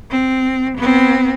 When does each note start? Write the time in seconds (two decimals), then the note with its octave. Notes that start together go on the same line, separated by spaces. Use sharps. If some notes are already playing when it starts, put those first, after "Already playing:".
0.10 C4
0.77 B3 C4